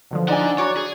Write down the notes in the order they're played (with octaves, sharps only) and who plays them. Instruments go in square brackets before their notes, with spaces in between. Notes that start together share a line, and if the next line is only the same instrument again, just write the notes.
[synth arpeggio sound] B2 D3 F3
[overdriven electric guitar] D4 F#5 [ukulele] D#4 G#5 [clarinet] D5
[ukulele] F#4 [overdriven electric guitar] C#5 [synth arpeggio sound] A#5 C#6 D6
[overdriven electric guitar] G#4